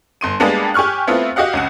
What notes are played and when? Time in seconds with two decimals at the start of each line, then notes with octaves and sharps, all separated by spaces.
0.21 G1 C6 D#7
0.40 G3 G#3 A#3 B3 D4
0.74 G4 G#5 C#6 F6 F#6
1.07 A3 B3 C4 E4 F4
1.36 F#4 G4 D#5 F5 F#5
1.53 C#2 C#4 F#5